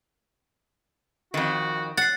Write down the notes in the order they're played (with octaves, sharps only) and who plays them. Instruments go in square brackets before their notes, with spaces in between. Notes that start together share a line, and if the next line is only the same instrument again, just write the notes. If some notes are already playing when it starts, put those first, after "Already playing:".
[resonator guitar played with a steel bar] F2 D#3 [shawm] F#4
[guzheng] F#5 [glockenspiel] A6 C7